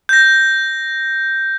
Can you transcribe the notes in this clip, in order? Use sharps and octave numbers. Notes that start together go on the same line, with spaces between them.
G6 A#6